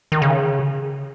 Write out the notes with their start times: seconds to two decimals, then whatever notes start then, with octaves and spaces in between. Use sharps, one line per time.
0.12 D#3
0.22 C#3